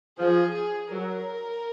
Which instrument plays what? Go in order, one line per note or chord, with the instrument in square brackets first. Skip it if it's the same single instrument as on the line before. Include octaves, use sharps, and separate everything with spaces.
[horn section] F3 [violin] G#4
[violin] G#4
[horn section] F#3 [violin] A#4